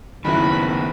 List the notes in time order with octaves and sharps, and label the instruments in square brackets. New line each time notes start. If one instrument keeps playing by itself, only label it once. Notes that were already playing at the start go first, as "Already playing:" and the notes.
[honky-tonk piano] F#1 E4 [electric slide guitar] D#3 B3 [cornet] B5